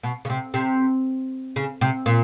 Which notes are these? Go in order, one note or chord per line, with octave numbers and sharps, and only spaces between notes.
B2
C#3
C3
C3
C#3
C3
A#2